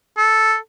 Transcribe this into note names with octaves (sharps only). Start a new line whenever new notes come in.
A4